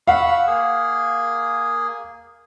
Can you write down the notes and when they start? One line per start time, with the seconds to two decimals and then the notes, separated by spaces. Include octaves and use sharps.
0.08 F5 F#5 B5 C#6 E6
0.47 A#3 G#4